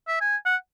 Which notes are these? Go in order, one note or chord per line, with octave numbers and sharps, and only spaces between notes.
E5
G#5
F#5